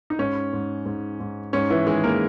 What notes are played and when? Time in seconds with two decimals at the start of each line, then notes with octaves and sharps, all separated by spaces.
0.10 D#4
0.18 G#2 C#4
0.53 G#2
0.86 G#2
1.20 G#2
1.53 G#2 C#4
1.70 E3 E4
1.87 D#3 G#3 G#4
2.04 A#3 A#4